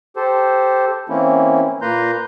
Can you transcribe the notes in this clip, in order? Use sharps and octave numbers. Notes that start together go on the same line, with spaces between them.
G4 A4 C5
E3 A#3 C4 C#4 E4
A#2 A#3 B4 A#5 C6 G6